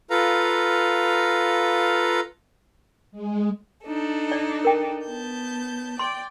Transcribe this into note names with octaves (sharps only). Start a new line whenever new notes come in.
F4 A4 B4 F5 A#5
G#3
D4 D#4 A4
D5
A#4 G5
B3 A5 G6
D5 G5 C6